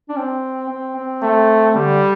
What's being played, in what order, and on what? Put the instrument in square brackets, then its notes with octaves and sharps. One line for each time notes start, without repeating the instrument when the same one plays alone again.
[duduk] D4
C4
C4
C4
[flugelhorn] A3 [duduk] C4
[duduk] D3 [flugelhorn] G3